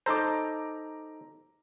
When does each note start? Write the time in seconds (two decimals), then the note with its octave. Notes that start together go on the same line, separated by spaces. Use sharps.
0.06 D#4 A4 C5 A#5 D6